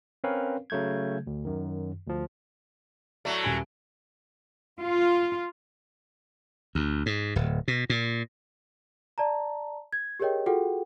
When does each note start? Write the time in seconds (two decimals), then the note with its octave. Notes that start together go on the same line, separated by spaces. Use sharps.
0.24 C4 C#4 A#4 B4 C#5 F5
0.70 C#3 F#3 A3 G6 G#6
1.27 D2
1.45 F#2 D#3
2.07 D2 F3
3.25 A2 F#3 A3 D5
3.43 D#1 G#5 D7
4.80 F4
6.75 D2
7.06 G#2
7.36 D1
7.68 B2
7.90 A#2
9.18 D5 A5 A#5
9.93 G#6
10.20 G4 G#4 A#4 C#5 D#5 G5
10.46 F4 F#4 G#4 A4 F#5 G5